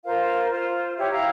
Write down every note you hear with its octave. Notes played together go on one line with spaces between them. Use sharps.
F4 A#4 C5 F5
F4 C5
E4 G4 C#5 E5
E4 F5 A#5